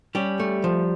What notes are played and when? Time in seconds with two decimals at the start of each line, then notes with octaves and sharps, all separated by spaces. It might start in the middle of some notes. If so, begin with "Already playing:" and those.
0.15 G3 C#4 G4
0.40 A3
0.64 F3